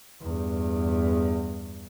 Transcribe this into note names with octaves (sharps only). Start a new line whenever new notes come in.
E2 G2